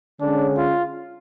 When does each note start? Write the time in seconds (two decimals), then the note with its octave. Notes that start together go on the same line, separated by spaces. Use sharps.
0.20 D3 G#3 C#4 D4 G#4 C#5
0.57 F4